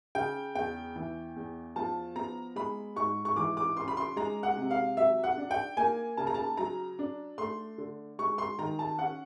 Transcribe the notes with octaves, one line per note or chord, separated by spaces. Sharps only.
C#3 G5
E2 G5
E3
E2
F3 A5
B3 A#5
G#3 B5
G#2 C#6
C#6
E3 D6
D6
C#4 C6
B5
C6
G#3 A#5
F#5
C3
F5
F#3 E5
F#5
D4
G5
A#3 G#5
C#3 A5
A#5
A5
F#3 A#5
D4
A3 C6
D3
G#3 C#6
C6
D#3 A#5
A5
C#4 F#5